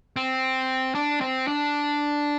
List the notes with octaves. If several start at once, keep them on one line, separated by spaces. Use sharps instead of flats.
C4
D4
C4
D4